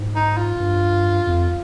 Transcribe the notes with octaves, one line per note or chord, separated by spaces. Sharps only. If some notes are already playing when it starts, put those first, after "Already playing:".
Already playing: G#2
D#4
F4
G2
F2